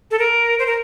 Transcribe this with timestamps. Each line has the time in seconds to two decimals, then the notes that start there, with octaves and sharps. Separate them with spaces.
0.11 A4
0.19 A#4
0.59 C5
0.66 A#4